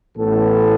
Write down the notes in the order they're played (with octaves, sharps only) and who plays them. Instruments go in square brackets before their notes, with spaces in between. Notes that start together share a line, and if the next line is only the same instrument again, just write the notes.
[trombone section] A1 A2 E3 B3 A4